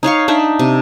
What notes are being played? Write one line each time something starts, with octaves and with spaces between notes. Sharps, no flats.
D#4 C#5 F5 C#6
D4 D#4 E5
C3